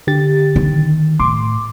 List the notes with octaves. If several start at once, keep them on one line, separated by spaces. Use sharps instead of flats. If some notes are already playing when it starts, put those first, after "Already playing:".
D3 G4 A6
D#3
A2 C6 D6